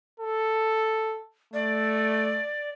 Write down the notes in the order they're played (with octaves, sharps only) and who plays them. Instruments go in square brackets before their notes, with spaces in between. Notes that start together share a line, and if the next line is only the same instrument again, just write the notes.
[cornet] A4
[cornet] A3 [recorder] D5